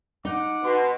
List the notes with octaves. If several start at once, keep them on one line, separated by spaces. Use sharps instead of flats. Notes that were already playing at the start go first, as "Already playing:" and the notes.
D#4 F#5 D6
B2 B4 C6